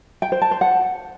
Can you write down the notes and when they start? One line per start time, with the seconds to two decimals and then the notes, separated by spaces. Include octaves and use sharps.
0.22 G5
0.32 C5
0.42 A5
0.51 C5
0.61 F#5